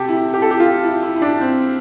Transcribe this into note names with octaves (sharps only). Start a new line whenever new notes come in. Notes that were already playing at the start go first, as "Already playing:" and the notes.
Already playing: C3 G4 A4
E4
G4
A4
G4
F4
E4
E4
E4
D4
C4